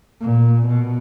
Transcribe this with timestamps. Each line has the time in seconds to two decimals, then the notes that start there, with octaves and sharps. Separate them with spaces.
0.21 A#2
0.67 B2